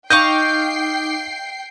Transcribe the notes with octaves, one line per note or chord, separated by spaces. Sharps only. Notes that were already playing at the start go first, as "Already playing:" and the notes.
D#4 D#5 F5 G5 C#6 D6 G6 C7